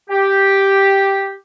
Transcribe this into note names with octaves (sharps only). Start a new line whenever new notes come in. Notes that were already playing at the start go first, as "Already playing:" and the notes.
G4